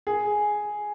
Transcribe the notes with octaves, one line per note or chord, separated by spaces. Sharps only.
G#4